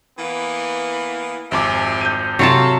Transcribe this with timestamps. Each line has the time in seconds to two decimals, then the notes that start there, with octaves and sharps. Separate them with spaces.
0.19 E3 A#3 B3
1.52 G#1 F2 G4 E5 G#5 D6
2.01 G6 D#7
2.39 C3 F#3 D4 F4 A4 A5